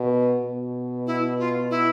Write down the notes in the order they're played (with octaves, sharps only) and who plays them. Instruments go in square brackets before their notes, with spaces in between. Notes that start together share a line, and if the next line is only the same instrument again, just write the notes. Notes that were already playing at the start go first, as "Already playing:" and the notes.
Already playing: [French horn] B2
B2
[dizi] E4
F4
E4